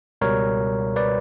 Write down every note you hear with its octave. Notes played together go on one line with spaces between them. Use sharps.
C#2 B2 G3 A#4 C#5
B4 D5